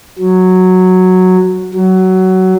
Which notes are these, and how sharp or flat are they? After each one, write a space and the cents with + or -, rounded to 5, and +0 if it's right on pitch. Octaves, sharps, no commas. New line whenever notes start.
F#3 -5
F#3 +15